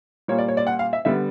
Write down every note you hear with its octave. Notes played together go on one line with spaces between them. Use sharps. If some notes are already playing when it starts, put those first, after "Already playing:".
A#2 G3 A#3 C#5
D5
C#5
D5
F#5
F5
E5
D3 G3 B3 E5